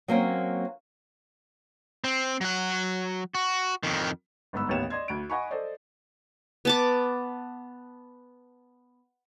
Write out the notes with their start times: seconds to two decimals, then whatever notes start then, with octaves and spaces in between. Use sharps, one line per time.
0.08 F#3 A#3 C4 C#4
2.04 C4
2.41 F#3 F#5
3.35 F#4
3.83 F2 D#3
4.53 G1 G#2 B3 B5 E6
4.69 A1 D#2 B3 C#5 E7
4.90 D5 D#5 C6 G#6
5.08 D2 D7
5.30 D#5 F#5 G#5 B5 C#6
5.51 A4 C5 D5 D#5
6.65 B3 A5 D6